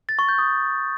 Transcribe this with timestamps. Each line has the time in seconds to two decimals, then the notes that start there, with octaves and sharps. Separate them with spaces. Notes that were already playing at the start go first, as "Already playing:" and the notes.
0.09 A6
0.19 C#6
0.29 G6
0.39 D#6